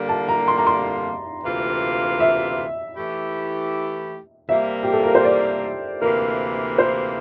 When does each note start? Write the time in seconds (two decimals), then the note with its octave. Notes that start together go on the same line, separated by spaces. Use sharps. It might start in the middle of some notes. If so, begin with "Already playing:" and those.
Already playing: D3 G3 A#3
0.09 A5
0.29 A#5
0.48 C6
0.58 A#5
0.67 C6
1.43 D2 C3 E3 A#3 F4
2.20 E5
2.96 E3 A3 E4 G4
4.48 C3 G3 A#3 E5
4.83 G4
4.93 A4
5.03 A#4
5.15 C5
5.24 D5
6.02 D2 C3 E3 A#3 A#4
6.78 C5